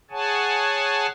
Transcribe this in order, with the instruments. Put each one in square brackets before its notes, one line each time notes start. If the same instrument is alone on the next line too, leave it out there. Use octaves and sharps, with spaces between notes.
[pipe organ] G#4 C#5 F#5 G#5 A5